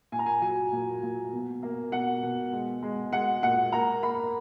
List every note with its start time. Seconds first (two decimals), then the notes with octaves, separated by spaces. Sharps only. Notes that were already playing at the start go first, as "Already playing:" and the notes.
0.12 A#2 G#5
0.19 A#5
0.26 G#5
0.42 F#3 G#5
0.72 A#2
1.03 A#2
1.33 B2
1.63 A#3
1.92 B2 F#5
2.23 B2
2.53 G#3
2.82 G#3
3.13 G#3 F#5
3.43 A#2 F#5
3.72 A#3 A#5
4.03 A#3 B5